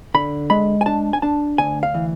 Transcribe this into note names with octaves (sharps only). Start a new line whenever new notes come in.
D3 B5
G#3 B5
G#5
D4 A5
G#5
D4 A5
D2 G#5
F5
E3